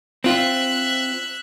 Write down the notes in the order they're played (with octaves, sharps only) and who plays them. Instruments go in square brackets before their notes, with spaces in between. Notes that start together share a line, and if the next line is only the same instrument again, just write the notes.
[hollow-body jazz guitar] C4 F4 [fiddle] E5 F#6